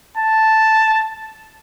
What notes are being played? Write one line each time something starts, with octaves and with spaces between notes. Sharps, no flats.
A5